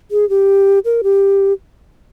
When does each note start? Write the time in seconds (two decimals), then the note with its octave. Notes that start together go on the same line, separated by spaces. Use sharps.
0.11 G#4
0.29 G4
0.85 A#4
1.03 G4